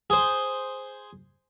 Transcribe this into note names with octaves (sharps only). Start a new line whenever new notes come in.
G#4 C5